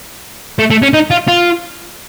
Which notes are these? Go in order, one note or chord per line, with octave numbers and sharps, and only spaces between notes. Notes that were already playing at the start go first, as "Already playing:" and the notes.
A3
A3
C#4
D#4
F4
F4